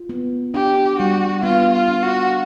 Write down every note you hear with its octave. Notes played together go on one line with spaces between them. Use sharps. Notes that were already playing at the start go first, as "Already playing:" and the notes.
Already playing: F4
B3
D4 G4
G3 F#4
B3 F4
F4
D4
F#4